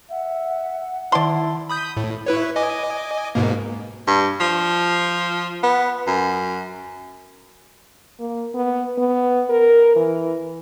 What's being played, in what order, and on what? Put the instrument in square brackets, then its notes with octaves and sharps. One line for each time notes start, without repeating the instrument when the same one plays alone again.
[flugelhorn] E5 [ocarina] F#5
[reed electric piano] D#3 A5 [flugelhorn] E4 [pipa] D5 C6
[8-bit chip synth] B5 D#6 G6
A2
E4 B4 C#5
D#5 G#5 D6
G#2 B2 A#3
[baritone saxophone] G2
F3
B3
F#2
[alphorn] A#3
B3
B3
A#4
E3